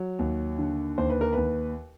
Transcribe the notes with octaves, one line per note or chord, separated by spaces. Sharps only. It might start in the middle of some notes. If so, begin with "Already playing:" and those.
Already playing: F#3
D#2
D3
D#2 C5
B4
A#4
D#2 B4